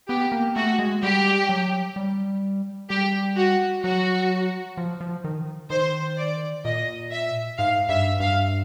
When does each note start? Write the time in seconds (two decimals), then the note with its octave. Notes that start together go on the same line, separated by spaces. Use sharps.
0.09 B3 G4
0.32 A#3
0.56 A3 F#4
0.79 G#3
1.02 G3 G4
1.49 F#3
1.96 G3
2.90 G3 G4
3.37 F#4
3.84 F#3 F#4
4.77 F3
5.01 F3
5.24 D#3
5.70 D#3 C5
6.17 D5
6.64 A#2 D#5
7.11 E5
7.58 G#2 F5
7.89 G2 E5
8.20 G2 F5